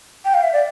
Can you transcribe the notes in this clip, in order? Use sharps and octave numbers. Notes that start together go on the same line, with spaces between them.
G5
F5
E5
D5